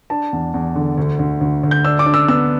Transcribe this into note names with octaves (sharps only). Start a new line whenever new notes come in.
D4 A5
E2
E2
D3
D2
D2
D2
D2
G6
D4 E6
D6
D4
E6
B3 E6